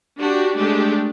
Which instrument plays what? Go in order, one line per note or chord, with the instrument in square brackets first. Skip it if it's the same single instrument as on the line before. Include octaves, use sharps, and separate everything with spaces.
[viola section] D4 F#4 G4
G#3 A3 D4 G4